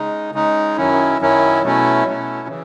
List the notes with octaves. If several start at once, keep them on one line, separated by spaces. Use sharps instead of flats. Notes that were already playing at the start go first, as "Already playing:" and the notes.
Already playing: C#3 G#3 D#4
C#3 G#3 D#4
F#2 D#3 F#3 C#4 E4
F#2 D#3 F#3 C#4 E4
B2 F#3 A3 C#4 E4
B2 F#3 A3 C#4 E4
C#3 E3